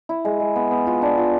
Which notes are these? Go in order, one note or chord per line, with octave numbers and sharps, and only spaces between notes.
E4
G#3
G#3
B3
B3
F4
D4
F4